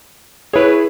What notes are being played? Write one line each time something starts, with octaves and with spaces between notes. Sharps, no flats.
E4 G#4 B4 C#5